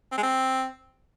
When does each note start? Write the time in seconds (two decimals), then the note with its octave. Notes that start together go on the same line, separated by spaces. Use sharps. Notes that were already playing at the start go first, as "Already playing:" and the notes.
0.12 C4
0.17 G#3
0.23 C4